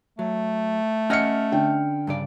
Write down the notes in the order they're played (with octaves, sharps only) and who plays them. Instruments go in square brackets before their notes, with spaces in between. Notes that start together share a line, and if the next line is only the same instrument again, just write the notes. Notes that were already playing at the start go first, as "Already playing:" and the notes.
[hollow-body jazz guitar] F#3 [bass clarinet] A3
[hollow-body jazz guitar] C#4 D#5 F#5 [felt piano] F6 C#7
[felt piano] D3 G5
[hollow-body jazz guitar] G2 C#3 D5